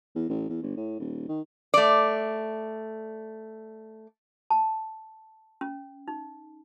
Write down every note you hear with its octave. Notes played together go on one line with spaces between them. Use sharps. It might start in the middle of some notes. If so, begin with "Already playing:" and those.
E2
A1
E2
G1
A2
D#1
D#3
A3 D5
A5
C#4
D#4